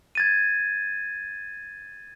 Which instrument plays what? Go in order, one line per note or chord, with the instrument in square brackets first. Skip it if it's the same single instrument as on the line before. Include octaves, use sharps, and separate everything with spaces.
[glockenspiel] G#6 A6 D#7